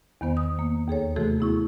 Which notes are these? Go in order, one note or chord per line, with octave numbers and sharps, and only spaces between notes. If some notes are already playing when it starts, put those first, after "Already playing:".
E2 D#3 B3 C5
D#6
A#3
D#2 G#4 A4 C#5
C3 E3 A3 F#4 G#4 A4
B3 E4 C#6